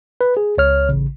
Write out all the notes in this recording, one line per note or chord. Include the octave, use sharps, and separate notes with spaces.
B4
G#4
C#2 C#5 F6
A1 C#3